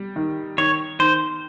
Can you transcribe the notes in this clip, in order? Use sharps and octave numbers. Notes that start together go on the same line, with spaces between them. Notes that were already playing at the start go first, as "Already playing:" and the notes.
Already playing: G3
D#3
D#3 C#5
D#3 C5